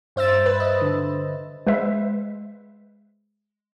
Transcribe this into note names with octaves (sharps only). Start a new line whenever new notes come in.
G2 C5 E5 E6 A6
B4
D#5
D3
G#3 B4 C5 E5